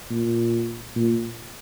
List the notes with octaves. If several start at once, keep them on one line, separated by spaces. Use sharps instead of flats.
A#2
A#2